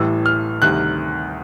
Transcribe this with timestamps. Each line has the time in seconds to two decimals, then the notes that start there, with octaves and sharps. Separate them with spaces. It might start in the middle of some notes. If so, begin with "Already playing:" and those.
Already playing: A1 A2 E3 G3 E6
0.26 F6
0.62 D2 C3 D#3 G3 F#6